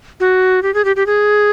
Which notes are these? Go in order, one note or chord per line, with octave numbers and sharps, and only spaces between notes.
F#4
G4
G#4
G4
G4
G#4